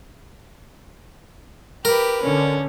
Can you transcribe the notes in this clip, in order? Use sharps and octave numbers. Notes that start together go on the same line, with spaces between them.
G4 A#4 B4
D3 C#4